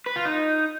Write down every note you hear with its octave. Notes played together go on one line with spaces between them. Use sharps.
B4
F4
D#4